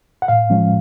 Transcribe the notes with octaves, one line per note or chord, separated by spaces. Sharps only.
F#5
A2 F5
F3 G#3 C#4